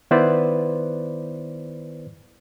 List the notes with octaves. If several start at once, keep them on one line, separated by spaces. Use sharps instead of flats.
D#3 B3 E4 B4 C5 D5